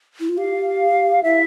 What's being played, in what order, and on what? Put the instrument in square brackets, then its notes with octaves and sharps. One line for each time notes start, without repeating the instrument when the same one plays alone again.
[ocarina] E4
F4
[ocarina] G4 [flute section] F5
[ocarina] E4 [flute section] E5